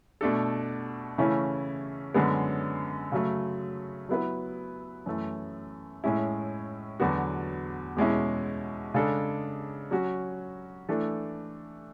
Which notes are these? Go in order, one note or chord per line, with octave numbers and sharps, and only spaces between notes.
B2 A3 D4 A4
C#3 E3 A3 C#4 E4
F#2 D3 G#3 B3
C#3 F#3 A3
F#3 B3 E4 B4
F#2 E3 A3
A2 G#3 C#4 E4
E2 D3 F#3 B3 F#4
E2 B2 G#3 C#4 E4
C#3 G#3 D4 A4
F#3 C#4 F#4
E3 A3 D4 A4